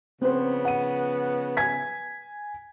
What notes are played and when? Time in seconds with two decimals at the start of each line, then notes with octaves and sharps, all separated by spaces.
0.22 C#3 F3 B3 C4 C5
0.65 F#5 D#7
1.57 G#5 G#6 B6